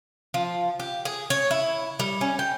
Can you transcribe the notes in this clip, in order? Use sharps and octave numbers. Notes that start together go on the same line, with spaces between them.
F3
G4
G#4
C#5
E4
G3
C#4
G5